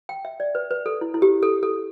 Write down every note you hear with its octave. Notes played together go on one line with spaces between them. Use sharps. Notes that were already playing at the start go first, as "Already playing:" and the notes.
G5
E5
D5
B4
B4
A4
E4
E4
G4
A4
A4